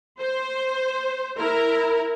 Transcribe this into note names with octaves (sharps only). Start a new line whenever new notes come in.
C5
E4 A#4